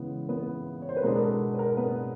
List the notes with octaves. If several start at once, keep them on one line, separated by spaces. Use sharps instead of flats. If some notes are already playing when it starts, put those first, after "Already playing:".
Already playing: C#3 E3 G#3 B3
B3 B4
C#5
C5
B4
B2 G#3 B3 D4 A#4
A#4
A4
B4
A#4
B3 B4